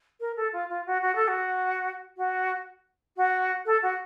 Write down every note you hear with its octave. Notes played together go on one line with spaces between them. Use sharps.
A#4
A4
F4
F4
F#4
F#4
A4
F#4
F#4
F#4
A4
F#4